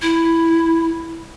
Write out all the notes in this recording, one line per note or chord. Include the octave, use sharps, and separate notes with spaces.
E4